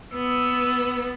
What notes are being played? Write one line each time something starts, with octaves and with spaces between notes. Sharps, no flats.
B3 E6